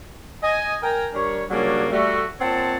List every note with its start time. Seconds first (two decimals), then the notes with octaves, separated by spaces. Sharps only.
0.42 D#5 G#5
0.82 A#4 G5 G#5
1.14 G3 D4 A#4 C#5
1.50 C#3 F#3 G3 A#3 C#4 D4
1.91 G3 A3 F#4
2.40 A#2 C4 C#5 F#5 A5